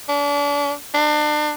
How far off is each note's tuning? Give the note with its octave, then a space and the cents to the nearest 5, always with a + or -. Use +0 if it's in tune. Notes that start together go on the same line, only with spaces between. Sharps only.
D4 -35
D4 +35